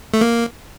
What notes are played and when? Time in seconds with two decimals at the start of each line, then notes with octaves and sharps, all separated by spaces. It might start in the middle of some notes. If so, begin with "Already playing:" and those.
0.14 A3
0.21 A#3